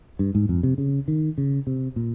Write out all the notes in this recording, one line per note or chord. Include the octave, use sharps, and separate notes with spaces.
G2
G#2
F2
C3
C#3
D#3
C#3
C3
A#2